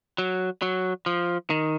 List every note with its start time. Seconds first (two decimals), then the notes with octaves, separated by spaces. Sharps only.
0.18 F#3
0.62 F#3
1.06 F3
1.50 D#3